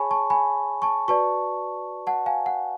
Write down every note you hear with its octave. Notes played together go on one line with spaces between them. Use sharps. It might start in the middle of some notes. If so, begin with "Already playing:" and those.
Already playing: G#4 C#5 G#5 A5 B5 C#6
A5 C#6
G#5 B5
A5 C#6
F#4 B4 D5 A5 C#6
F#5 A5
F5 G#5
F#5